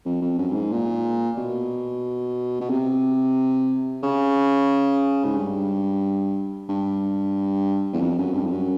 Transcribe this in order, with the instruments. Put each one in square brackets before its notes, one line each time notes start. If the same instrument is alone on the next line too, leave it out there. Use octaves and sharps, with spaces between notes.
[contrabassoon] F2
F2
F#2
G2
G#2
A#2
B2
B2
C3
C#3
G#2
G2
G2
E2
F2
F#2
G2
F2
F#2